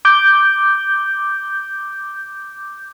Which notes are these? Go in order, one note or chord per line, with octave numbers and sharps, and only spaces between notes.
D6 G6